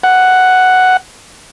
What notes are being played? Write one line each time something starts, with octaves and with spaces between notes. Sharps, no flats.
F#5